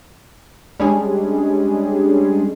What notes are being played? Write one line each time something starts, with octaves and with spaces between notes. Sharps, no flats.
G3 G#3 C#4 D4 G#4